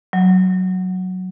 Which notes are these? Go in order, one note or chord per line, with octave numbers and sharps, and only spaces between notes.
F#3